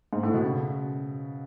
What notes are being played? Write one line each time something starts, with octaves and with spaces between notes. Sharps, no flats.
G#2
A2
B2
C#3